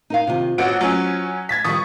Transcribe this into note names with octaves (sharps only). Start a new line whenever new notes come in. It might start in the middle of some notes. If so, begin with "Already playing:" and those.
D#4 A#4 F5
C3 D#3 F4
A1 F4 F#4 C5 C#5 D7
F#3 C#4
G#6 A6 B6
D#3 F3 G3 C#6 D#6